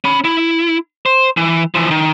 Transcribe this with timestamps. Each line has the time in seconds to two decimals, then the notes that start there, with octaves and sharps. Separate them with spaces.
0.05 C#4 B5
0.25 E4
1.06 C5
1.37 E3
1.75 E3 F3
1.91 D#3